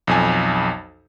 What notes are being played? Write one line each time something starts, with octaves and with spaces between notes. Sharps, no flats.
B1 F2 G#5